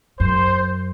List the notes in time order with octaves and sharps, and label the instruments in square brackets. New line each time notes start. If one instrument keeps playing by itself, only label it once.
[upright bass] F#2 [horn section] C5